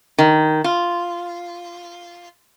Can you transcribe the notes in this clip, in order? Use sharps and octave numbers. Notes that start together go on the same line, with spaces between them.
D#3
F4